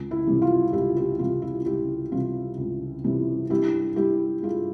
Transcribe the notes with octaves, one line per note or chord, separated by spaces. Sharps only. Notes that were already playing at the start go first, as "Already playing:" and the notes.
Already playing: C#2
E4
C3 E3 G3
F4
C#2 E4 G4
E4 G4
C3 E3 G3 F4
E4 G4
C#2 E4 G4
C3 E3 G3 F4
C#2
C3 E3 G3
G2 E4 G4
G3 E4 G4
G2 F4 G#4